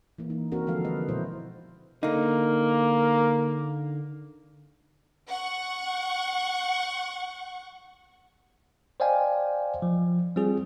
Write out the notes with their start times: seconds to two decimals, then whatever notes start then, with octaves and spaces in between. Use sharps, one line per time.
0.18 E3 A#3
0.30 D#4
0.52 C4 D4 F#4 A#4
0.67 D3 F3 G#3 A4 F5
0.85 G#3 B4 D#5
1.08 B2 E4 C5
2.03 D3 A#3 D#4
5.28 F#5 C#6
9.00 C5 D5 D#5 F5 G5 G#5
9.82 F3
10.36 G3 C4 F4 G#4